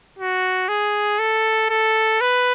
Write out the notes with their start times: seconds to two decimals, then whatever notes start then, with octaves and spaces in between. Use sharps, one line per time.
0.19 F#4
0.68 G#4
1.19 A4
1.69 A4
2.21 B4